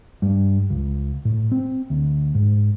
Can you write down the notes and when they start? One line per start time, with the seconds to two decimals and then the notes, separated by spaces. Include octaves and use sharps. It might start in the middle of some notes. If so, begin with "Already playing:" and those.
0.22 G2
0.70 C#2
1.25 A2
1.52 C4
1.90 D2
2.35 G#2